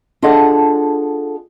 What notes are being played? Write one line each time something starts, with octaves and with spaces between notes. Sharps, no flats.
D4 F4 G#4 A4 D#5 F#5